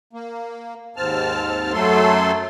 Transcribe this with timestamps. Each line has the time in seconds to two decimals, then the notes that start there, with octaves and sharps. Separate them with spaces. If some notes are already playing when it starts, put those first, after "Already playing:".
0.13 A#3
0.96 D#2 G#2 C4 A5 F6
1.73 F#2 F#3 A3 A4 C6